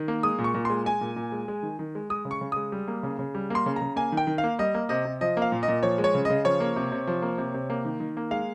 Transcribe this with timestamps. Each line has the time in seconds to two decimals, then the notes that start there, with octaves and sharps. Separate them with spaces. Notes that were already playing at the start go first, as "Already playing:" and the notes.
Already playing: D#3
0.08 A#3
0.23 G#3 D#6
0.38 A#2
0.44 C#6
0.54 A#2
0.65 G#3 C6
0.85 G#3 G#5
1.01 A#2
1.16 A#2
1.32 G#3
1.48 G#3
1.63 D#3
1.79 D#3
1.95 G#3
2.10 G#3 D#6
2.25 C#3
2.31 C#6
2.41 C#3
2.52 G#3 D#6
2.72 G3
2.88 A#3
3.03 C#3
3.19 C#3
3.35 G3
3.50 A#3 C6
3.66 C#3
3.76 A#5
3.82 C#3
3.96 A#3 G#5
4.12 D#3
4.17 G5
4.27 D#3
4.38 F5
4.44 A#3
4.59 G3 D#5
4.74 A#3
4.89 C3 D#5
5.05 C3
5.21 F3 D#5
5.37 A#3
5.42 F5
5.52 A#2
5.63 D#5
5.68 A#2
5.83 F3 C#5
5.98 G#3
6.04 C#5
6.15 C#3
6.25 C#3 D#5
6.45 F3 C#5
6.60 A#3
6.76 C3
6.92 C3
7.07 F3
7.22 A#3
7.38 C3
7.54 C3
7.70 A#3
7.85 D#3
8.00 D#3
8.17 A#3
8.31 G#3 F5